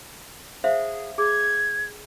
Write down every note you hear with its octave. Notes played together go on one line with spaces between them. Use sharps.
G#4 C5 E5 F5
G#4 G#6